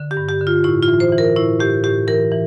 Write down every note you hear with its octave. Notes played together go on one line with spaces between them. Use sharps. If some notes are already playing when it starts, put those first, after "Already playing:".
Already playing: D3
G4
G2
G4
D3
F4
A2 E4
F4
E3
C5
E3
A#4
A2 E4
A2 G4
A2 G4
E3 A#4
E3